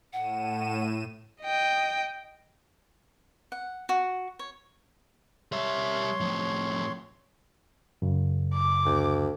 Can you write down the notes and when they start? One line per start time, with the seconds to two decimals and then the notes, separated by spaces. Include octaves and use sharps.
0.13 A2 F#5 D#7 E7
1.42 D#5 G5
3.52 F#5
3.89 F#4
4.39 C#5
5.52 G3 C#5 E5 C6
6.20 A2 F3
8.02 F#2 C#3
8.54 D6
8.85 D2